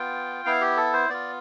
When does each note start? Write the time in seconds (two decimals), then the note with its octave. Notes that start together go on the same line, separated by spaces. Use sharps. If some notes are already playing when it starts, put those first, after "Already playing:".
Already playing: B3 F4 G5
0.45 B3 E4 F5
0.61 G4
0.77 A4
0.93 C5
1.09 B3 F4 D5